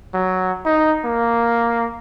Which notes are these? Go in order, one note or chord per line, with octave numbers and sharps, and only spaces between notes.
F#3
D#4
A#3